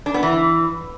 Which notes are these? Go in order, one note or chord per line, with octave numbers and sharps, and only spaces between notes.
D4
B3
E3